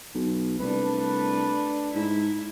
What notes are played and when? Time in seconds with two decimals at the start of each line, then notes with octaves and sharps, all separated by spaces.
0.14 B1
0.59 C2 A3 D4 B4
1.95 G#2 E4